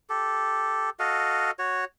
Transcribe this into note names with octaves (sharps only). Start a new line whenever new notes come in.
G4 A4
F#4 A4 D#5 F5
F#4 C#5